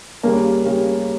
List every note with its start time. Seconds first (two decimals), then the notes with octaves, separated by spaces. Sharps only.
0.23 D#2 C#3 G3 A#3
0.64 D#2 C#3 G3